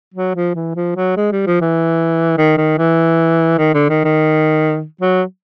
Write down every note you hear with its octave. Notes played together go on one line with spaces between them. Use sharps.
F#3
F3
E3
F3
F#3
G#3
G3
F3
E3
D#3
D#3
E3
D#3
D3
D#3
D#3
F#3